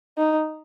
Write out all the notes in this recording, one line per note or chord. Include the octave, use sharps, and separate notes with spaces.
D#4